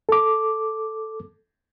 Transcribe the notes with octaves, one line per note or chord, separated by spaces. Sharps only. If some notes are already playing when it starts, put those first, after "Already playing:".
A4 D6